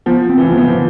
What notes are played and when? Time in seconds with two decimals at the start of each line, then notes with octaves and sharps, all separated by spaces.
0.06 F3 B3
0.29 C4
0.38 E3
0.47 F3
0.52 B3
0.58 E3
0.68 F3